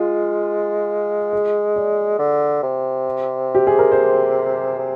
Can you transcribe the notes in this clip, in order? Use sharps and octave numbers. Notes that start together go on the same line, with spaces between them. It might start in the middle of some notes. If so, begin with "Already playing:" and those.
Already playing: G#3 F4
G#4
D5
D3
C3
G4
G#4
A#4
C5
C3